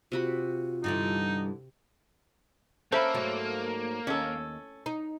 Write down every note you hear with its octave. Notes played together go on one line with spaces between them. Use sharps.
C3 F4 F#4 B5
G2 D3 E3 D#4
A#3 C#4 A4 C5 E5 B5
G#2 F#3 A3
D#2 C#4 A4
D#4